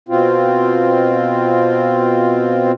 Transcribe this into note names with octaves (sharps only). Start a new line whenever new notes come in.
B2 C4 F4